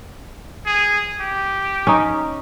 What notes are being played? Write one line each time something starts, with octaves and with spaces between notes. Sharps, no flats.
G#4
G4
C#4 D#4